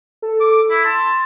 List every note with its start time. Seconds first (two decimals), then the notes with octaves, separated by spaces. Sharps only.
0.22 A4
0.41 D6
0.70 E4
0.84 A5 C6